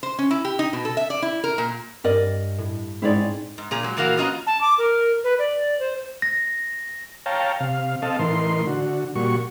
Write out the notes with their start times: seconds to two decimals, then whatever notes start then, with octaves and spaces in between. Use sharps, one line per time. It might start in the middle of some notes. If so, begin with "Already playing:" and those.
0.03 C5
0.19 C#4
0.31 E4
0.45 G4
0.59 D#4
0.73 B2
0.85 A4
0.97 E5
1.10 D5
1.22 E4
1.44 A#4
1.58 A#2
2.04 G2 A#4 D5 D#5
2.58 A2
3.02 G#2 C4 C#4 D#4 E4 C#5 D5
3.58 G#2
3.71 A#2 G#4 A#5
3.83 F#3 G#3
3.97 A#2 E3 A#3 F#4 F5
4.17 B3 C#4 F4 F#4 D#5 A#5
4.47 A5
4.61 D6
4.78 A#4
5.24 B4
5.39 D5
5.80 C5
6.22 A#6
7.26 C#5 F5 G5 A5 A#5
7.60 C3 F5
8.02 C4 A4 D#5 F5 A5
8.19 A2 E3 D#4 A#4 C6
8.67 D3 F#4
9.15 A#2 G3 F#4 C#6